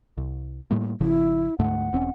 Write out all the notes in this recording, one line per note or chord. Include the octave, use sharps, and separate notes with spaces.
C2
A2 G3 A#3
G#1 C#3 F3 E4
D2 G#2 A3 F#5
E1 C4 C#4